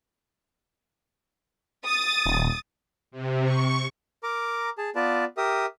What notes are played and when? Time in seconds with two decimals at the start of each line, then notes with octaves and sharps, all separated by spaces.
1.85 D#6 A6
2.26 D#1
3.11 C3
3.43 C#6
4.23 A#4 A#5 D6
4.78 G#4 A5
4.95 B3 F4 B4 D5 A5
5.37 G4 A#4 E5 D#6